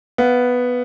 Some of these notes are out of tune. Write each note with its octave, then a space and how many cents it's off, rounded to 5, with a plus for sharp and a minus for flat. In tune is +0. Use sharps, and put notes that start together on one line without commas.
B3 +0 F5 -10